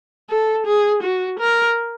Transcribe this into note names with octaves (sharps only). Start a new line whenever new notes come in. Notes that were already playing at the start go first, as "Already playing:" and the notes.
A4
G#4
F#4
A#4